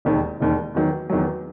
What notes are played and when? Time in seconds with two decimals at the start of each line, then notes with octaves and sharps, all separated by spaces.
0.05 E1 D#2 D#3
0.41 E1 D#2 D#3
0.75 E2 D#3 F#3
1.09 E2 D#3 F#3